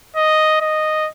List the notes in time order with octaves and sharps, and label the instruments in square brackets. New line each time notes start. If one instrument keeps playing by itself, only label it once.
[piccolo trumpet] D#5
D#5